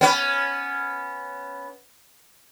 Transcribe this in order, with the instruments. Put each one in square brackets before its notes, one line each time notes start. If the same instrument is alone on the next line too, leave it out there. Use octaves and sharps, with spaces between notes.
[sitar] B3 C#4 B4